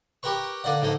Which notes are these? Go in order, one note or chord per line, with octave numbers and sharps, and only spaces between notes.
G4 A#4 B4 C#6
D3 A#3 D5 F#5
G#2 D3 A3 A#3